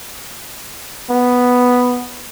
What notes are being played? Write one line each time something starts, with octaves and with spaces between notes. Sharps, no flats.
B3